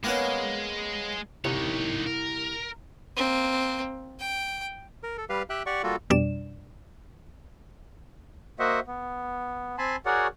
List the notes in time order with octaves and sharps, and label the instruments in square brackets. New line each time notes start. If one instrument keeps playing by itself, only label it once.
[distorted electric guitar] G#3 [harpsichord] A#3 B3 C#4
[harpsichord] C2 [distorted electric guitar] D#4 C#5
[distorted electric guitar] A#4
[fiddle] A#3 C4
G5
[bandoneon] A#4
A4
G3 G4 B4 F5
G4 E5 G5 F#6
G4 D5 F#5 C#6
G3 A#3 F4 F#4 A4
[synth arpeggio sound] F2 B2 G3 D4 D5 E7
[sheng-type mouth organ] A#3 F#4 C5 D#5 E5 F#5
B3
C4 G#5 A5 B5 C6
F#4 G#4 A#4 C#5 D5 F#5